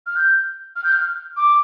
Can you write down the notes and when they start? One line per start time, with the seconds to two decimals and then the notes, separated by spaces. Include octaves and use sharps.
0.06 F6
0.16 G6
0.76 F6
0.84 G6
0.92 F6
1.37 D6